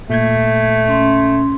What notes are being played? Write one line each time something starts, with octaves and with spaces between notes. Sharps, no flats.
A#2 A3 G6 G#6
C#4 C6